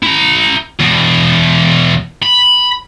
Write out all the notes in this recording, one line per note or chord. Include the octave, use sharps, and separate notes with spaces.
E4 A#5
E2 B2
B5